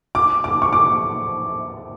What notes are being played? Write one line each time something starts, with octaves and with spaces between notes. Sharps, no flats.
D6
D6
C#6
D6